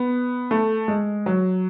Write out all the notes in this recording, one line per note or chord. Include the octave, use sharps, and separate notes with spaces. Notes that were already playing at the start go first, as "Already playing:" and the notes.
Already playing: B3
A3
G#3
F#3